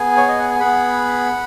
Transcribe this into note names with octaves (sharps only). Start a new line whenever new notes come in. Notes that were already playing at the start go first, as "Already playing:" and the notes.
Already playing: B3 G#4 G#5
C#5
D#5
F#5
G#5
B3 G#4 F#5 B5